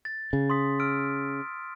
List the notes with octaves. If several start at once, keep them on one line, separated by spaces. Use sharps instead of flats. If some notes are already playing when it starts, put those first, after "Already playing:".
A6
C#3
C6 D#6 B6
E6 F6 D7